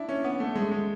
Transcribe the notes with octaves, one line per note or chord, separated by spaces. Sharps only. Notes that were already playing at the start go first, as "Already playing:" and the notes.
Already playing: D4 E4
C#4
B3
A3
G#3
G#3